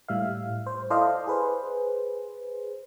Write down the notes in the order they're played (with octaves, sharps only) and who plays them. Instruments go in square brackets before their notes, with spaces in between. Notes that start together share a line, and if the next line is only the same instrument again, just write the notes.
[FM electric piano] A2 G3 E5 F5
C5
E4 A4 C5 D5 D#5 F5
G#4 B4 C5